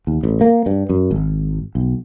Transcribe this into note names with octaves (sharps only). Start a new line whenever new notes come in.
D#2
A1
A#3
G2
F#2
G#1
B1